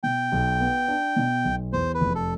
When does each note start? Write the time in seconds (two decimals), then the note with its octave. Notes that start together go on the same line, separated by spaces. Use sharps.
0.03 B2 G5
0.32 B1
0.60 B3
0.88 D4
1.16 B2
1.45 B1
1.72 E2 C5
1.94 B4
2.01 F1
2.15 A4